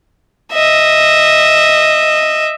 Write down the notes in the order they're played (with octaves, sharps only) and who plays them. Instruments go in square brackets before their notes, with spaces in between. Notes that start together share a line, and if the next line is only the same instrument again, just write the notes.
[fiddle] D#5 E5